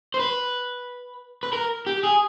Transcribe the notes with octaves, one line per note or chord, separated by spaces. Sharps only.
C5
B4
B4
A#4
G4
G#4